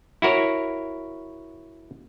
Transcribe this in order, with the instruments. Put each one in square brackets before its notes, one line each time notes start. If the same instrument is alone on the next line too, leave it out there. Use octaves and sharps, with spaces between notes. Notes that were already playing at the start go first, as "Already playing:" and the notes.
[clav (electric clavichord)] E4 F#4 A#4 C#5